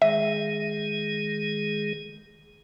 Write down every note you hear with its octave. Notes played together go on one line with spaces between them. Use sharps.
D#3 G#3 G#4 E5